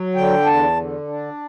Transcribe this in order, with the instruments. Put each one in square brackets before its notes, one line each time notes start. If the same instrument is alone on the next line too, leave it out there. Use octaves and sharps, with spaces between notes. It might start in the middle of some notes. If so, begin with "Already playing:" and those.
Already playing: [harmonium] F#3
D3 G5
E2 A5
D3
D4